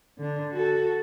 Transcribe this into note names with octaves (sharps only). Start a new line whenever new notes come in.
D3 D4
F#4 A4